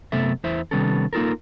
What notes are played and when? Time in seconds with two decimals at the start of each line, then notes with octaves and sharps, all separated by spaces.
0.12 F#2 C3 A3 B3 A4 E5
0.44 E2 E4 C5 E5
0.71 C3 D#3 G3 B3 C#4 A4
1.13 A#3 D#4 F4 A4 A#4